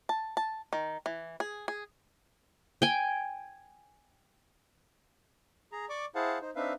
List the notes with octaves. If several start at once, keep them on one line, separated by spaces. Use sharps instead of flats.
A5
A5
D#3
E3
G#4
G#4
G5 G#5
G#4 A#5
D5 C#6 D6
E4 G#4 C5 F5 F#5 A5
D#4 C5
C4 D4 D#4 B4 E5 F5